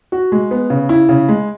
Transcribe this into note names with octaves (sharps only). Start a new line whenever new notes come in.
F#4
G#3
B3
C#3
E4
C#3
G#3